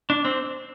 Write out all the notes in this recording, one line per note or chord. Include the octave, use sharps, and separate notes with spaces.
D4
C4